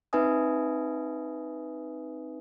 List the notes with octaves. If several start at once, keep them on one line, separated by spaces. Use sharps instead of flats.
C4 D#4 B4 E5 G#5 D#6